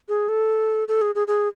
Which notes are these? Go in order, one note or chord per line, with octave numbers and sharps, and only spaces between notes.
G#4
A4
A4
G#4
G#4
G#4